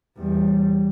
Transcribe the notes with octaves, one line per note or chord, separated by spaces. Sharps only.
E2 G3